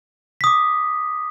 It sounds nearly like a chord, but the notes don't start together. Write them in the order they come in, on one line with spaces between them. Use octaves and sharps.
B6 D#6 D6